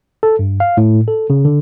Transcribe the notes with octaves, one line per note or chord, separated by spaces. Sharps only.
A4
G2
F5
A2
A4
C#3
D3